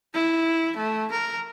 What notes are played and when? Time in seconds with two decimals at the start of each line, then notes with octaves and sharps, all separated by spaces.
0.14 E4
0.77 A3
1.12 A#4